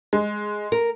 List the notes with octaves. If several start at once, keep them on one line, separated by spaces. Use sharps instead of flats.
G#3
A#4